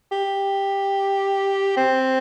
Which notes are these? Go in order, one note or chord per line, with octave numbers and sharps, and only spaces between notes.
G4
C4